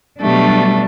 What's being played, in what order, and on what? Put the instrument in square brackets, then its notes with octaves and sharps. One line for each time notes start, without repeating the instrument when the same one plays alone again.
[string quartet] B2 A3 [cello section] F#3 G3 D4